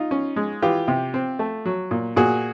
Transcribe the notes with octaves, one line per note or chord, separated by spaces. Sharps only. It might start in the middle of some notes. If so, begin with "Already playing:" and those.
Already playing: D#4 F4
C#4
G#3
E3 F4 G4
C3
C4
A3
F#3
A#2
A#2 F#4 G#4